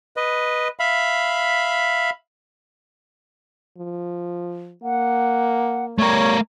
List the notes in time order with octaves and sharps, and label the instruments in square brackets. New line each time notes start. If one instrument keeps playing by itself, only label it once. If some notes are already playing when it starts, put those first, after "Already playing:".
[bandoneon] B4 D#5
E5 F5 B5
[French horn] F3
[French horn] A#3 [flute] F#5
[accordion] G3 C#5 [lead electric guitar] A3 A#4